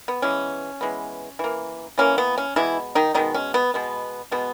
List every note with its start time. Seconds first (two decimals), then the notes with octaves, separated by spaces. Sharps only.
0.08 B3
0.22 E3 G#3 B3 C#4
0.81 E3 G#3 B3
1.39 E3 A#3
1.98 E3 A#3 C#4
2.18 B3
2.38 C#4
2.56 B2 E3 G#3 B3 E4
2.95 D#3 D#4
3.14 B2 D#3 G#3 B3 D#4
3.34 C#4
3.54 B3
3.74 B2 G#3 B3
4.31 B2 G#3 B3